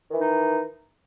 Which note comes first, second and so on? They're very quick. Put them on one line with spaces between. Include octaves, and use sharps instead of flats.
D#3 E3 D#4